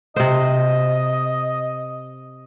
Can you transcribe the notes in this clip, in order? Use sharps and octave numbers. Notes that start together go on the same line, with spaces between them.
C3 C5 D#5